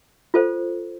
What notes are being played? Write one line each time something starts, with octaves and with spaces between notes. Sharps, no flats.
F4 A4 C5